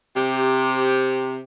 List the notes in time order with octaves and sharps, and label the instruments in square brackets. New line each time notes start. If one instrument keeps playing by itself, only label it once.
[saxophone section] C3 G4